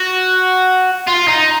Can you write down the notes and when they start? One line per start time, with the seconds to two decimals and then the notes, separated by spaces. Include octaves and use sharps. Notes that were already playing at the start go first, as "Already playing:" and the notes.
Already playing: F#4
1.07 F4
1.27 D#4